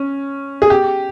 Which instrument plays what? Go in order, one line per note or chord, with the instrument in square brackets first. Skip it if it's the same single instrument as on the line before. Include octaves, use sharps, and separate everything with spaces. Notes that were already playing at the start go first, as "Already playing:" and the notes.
Already playing: [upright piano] C#4
G#4
G4